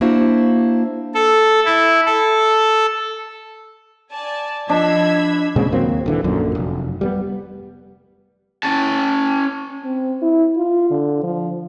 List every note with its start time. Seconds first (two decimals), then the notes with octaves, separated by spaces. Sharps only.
0.01 A#3 D4 E4 F#4 C5
1.14 A4
1.65 E4
2.06 A4
4.12 D5 G#5 A5
4.70 F3 D4 D#5 B5 E6 G#6
5.56 A#2 C#3 G#3 C4
5.72 D#2 F#3 A#3 C4
6.06 D#1 D3 E3
6.24 A#1 F#2 A#2 D3
6.55 F1
7.01 G3 A#3 B3
8.63 C#4 A5
9.84 C4
10.22 E4
10.57 F4
10.90 D3
11.23 F3